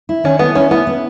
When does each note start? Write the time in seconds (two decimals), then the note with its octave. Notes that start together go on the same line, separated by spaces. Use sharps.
0.09 E4
0.24 D#3 C#4
0.39 A3 B3
0.55 C#4 E4
0.71 B3 E4
0.87 B3